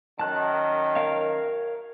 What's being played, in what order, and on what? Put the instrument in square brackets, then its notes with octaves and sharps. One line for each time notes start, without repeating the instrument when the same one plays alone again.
[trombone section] F#2 D#3 [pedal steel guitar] A5 F#6
[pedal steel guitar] A#4 C#5 F5